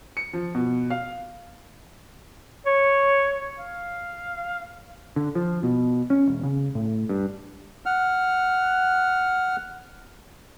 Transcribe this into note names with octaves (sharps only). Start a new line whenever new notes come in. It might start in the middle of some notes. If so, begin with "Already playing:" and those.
C#7
F3
B2
F5
C#5
F5
D3
F3
B2
C#4
E1
C#3
A2
G2
F#5 F6